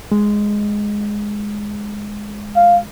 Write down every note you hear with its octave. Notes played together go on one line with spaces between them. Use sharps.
G#3
F5